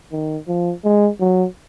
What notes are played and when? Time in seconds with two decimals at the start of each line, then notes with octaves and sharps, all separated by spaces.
0.12 D#3
0.48 F3
0.84 G#3
1.20 F#3